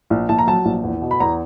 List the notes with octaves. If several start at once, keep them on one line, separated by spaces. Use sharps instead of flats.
A#1
A#1 A5
A#5
F#3 A5
A#1
E2
B2
B5
E2 A#5